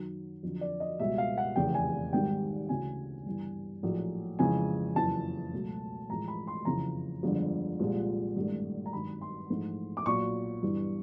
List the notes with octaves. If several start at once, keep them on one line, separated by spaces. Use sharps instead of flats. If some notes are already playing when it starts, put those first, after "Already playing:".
Already playing: F#2 D#3 F#3
F2 D3 F#3
D5
D#5
C#2 B2 G3 E5
F5
F#5
F1 E2 C#3 G5
G#5
G#1 G#2 D#3 G3 G5
D2 C#3 E3 G#5
G1 G2 E3
A#1 A2 F#3 A3
F2 C#3 E3 G#3 G#5
F#1 F2 C#3 E3 A5
C#2 B2 F#3 A3
A1 A2 F3 G#3 A#5
B5
C6
F#1 F2 C#3 E3 A#5
G1 F2 D3 F3 G#3
C2 A#2 F3 G#3
G#1 G2 E3 A3
A#5
G#1 G2 D#3 F#3 B5
C6
A#1 G#2 E3 A3
D6
B1 A#2 F#3 C#6
G1 G2 E3